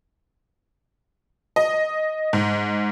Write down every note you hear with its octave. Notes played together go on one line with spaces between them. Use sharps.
D#5
G#2